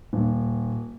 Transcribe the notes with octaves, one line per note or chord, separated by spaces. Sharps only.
D#1